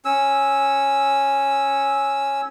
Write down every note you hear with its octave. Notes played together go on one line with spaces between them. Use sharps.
C#4 E6